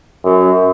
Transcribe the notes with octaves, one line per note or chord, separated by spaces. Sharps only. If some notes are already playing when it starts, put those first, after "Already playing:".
F#2